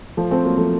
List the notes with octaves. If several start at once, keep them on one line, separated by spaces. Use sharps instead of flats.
F3 A3
A3 C4
F#3 A#3
F3 A3